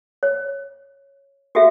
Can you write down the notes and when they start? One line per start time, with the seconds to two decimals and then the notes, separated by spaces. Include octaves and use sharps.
0.23 C#5
1.55 F#4 G4 A4 E5 F5